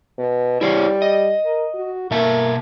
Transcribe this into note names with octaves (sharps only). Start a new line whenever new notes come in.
B2
G3 E4 C5 C#5
D#5
A#4
F#4
B2 A#3 E5 A5